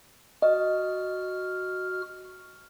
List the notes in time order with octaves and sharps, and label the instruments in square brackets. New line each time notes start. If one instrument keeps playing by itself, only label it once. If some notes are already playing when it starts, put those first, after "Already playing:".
[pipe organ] F#4 F6 [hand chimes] D#5